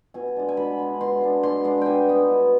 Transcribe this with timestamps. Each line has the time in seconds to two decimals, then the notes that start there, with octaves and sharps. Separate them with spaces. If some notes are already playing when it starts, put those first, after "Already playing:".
0.14 B2 G#5
0.36 G#3 D4
0.49 G#5
0.57 B2 B5
0.79 G#3 D4
1.01 B2 C6
1.21 G#3 D4
1.43 B2 C6
1.64 G#3 D4
1.81 B2 G5 G#5
2.07 G3 B3 D#4
2.28 B2